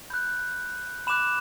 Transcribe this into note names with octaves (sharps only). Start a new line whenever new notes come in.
B5 F#6 G6
B5 D6 F#6 E7